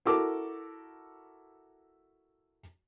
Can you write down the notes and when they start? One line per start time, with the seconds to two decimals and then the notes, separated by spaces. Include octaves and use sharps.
0.05 E4 F#4 A4 A#4 D6